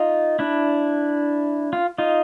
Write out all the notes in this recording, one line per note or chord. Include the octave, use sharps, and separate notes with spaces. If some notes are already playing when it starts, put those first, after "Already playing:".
Already playing: D#4 F4
D4 E4
F4
D#4 F4